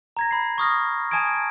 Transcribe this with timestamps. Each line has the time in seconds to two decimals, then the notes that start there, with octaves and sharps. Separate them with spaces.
0.17 A#5 G#6 A#6
0.31 B5 C7
0.58 C#6 D#6 F6 A#6
1.11 G#5 A5 D#6 G#6 D7